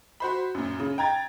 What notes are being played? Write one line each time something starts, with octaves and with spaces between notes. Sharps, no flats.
F#4 C5 B5
F#2 A#2
C#3
G5 A#5 G#6 A6